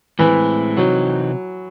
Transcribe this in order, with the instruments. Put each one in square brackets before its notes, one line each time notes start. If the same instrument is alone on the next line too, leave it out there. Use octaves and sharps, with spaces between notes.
[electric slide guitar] A2 G#3 C4 E4 [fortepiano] E3
[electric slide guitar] C3 E3 C4 D#4 [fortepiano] F#3